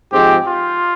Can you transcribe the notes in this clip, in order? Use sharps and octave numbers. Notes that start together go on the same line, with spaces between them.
G#2 F3 G#3 C4 G4
F4